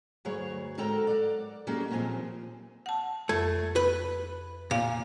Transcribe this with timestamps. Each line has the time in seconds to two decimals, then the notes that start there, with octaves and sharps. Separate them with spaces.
0.25 D2 G2 F#3 G#4 C#5
0.78 G#2 F#4 A4 A#4 G5 A#5
1.07 D5 F#5
1.67 F#3 A#3 C#4 D#4 G4 G#4
1.90 D#2 A#2 F3 C4 G#5
2.86 F#5 A5
3.29 F2 A3
3.76 B4
4.71 A#2 F5